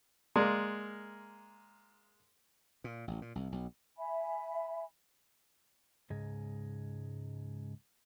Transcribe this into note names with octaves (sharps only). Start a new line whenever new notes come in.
G#3 A#3 D5 C6
A#2
A1
A#2
C2
B1
E5 G#5 B5
C#2 G#2 G#3